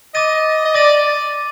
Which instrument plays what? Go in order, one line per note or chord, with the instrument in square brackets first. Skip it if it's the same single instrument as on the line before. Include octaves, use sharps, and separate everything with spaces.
[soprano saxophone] D#5 [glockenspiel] D6 A6 D#7
[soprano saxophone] D#5
[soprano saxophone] D5 [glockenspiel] D6 A6 D#7